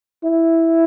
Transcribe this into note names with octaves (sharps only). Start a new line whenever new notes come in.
E4